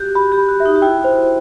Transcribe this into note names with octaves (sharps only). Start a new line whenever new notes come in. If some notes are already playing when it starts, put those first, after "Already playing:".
Already playing: F#4 G4
F#4 B5
G4
B5
F#4
E5
D#4
F#4
E4 G5
C5